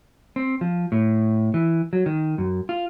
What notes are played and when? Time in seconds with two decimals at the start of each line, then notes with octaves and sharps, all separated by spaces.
0.36 C4
0.61 F3
0.92 A2
1.54 E3
1.93 F#3
2.06 D#3
2.38 F#2
2.69 F4